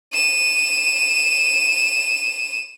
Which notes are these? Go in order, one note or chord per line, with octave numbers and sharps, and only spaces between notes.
D#7 E7